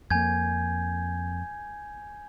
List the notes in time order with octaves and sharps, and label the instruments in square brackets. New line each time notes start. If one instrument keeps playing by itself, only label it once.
[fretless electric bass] F2 A#3 [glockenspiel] G#5 G6 G#6